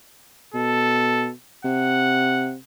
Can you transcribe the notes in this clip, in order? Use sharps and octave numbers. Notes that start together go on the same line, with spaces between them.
B2 A4
C3 F#5